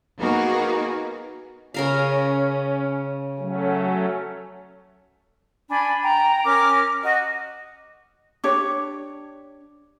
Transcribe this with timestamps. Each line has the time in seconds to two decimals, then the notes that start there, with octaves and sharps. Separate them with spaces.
0.18 A#3 B3 D#4 F#4 G#4 A#4
1.74 C#3 C#4 A#4 F5
3.39 F#3 A3 C#4
5.69 D4 G#5 B5
6.04 G5 A#5
6.44 C#4 A#4 D6 F6
7.02 F#4 D#5
8.44 D4 G4 C#5 D6